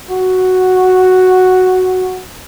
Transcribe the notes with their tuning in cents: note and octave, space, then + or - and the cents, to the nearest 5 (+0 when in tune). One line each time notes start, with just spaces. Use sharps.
F#4 +0